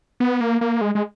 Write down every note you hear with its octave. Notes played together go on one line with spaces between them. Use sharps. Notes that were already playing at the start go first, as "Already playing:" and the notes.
B3
A#3
A#3
G#3
G#3